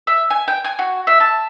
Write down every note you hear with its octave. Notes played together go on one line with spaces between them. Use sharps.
E5
G#5
G5
G#5
F#4
E5
A5